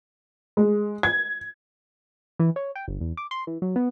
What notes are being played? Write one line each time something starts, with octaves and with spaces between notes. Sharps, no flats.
G#3
G#6
E3
C#5
G5
G1
E2
D6
C6
E3
F#3
B3